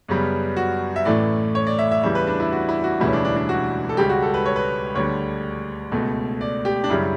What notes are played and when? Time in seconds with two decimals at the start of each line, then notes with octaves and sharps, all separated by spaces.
0.09 F#2 C#3 G3 B3
0.57 F#4
0.96 E5
1.05 A1 A2 E3 A3 D5
1.55 C#5
1.67 D5
1.79 E5
1.91 E5
2.03 E2 C#3 E3 G3 E5
2.15 B4
2.27 D4
2.40 E4
2.52 F#4
2.69 E4
2.84 F#4
3.00 E1 D2 C#3 E3 G3 E4
3.08 C#4
3.13 D4
3.25 D4
3.36 D4
3.49 F#4
3.89 A4
3.97 C#2 C#3 G3 G4
4.09 F#4
4.22 A4
4.34 B4
4.46 C#5
4.56 B4
4.95 D2 D3 G3 C#5
5.92 C#2 B2 A3
6.41 D5
6.65 G4
6.84 D4
6.90 F#2 C#3 G3 E4